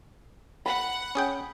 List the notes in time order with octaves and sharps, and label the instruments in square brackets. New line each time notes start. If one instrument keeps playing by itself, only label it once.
[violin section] F#5 [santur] B5
[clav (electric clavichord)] C#4 G#4 G5